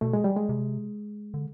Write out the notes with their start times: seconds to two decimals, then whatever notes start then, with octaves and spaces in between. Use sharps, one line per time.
0.01 B2 A3
0.13 G#3
0.24 G3
0.36 G#3
0.49 C3
1.34 D3